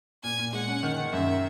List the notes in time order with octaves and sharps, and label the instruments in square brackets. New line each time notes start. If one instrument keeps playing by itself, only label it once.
[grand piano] A#2 [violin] G#5
[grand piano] A#2
[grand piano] G#3 [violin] F#5
[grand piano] C#4
D#3
D#3
[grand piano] F#2 [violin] E5